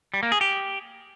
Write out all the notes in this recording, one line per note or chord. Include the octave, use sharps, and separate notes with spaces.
G3
A#3
G#4
G4